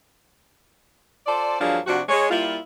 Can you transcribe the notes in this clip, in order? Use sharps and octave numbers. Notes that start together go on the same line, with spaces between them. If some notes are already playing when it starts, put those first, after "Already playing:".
F4 A4 C5 D5
G2 F3 F#3 A#3 D4 G#4
C3 F3 D4 F#4
G#3 C#5
G3 A#3 E4 F4